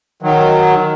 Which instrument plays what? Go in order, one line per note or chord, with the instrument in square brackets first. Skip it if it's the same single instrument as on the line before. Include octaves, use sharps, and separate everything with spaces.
[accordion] D#3 F#3